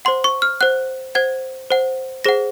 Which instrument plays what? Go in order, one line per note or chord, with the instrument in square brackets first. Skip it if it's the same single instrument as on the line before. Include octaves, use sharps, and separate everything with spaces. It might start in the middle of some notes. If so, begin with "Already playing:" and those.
[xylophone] C5 F#5 C6
C#6
F6
C5 F#5 F#6
C5 F#5 G#6
C5 F#5
G#4 C5 F#5 A#6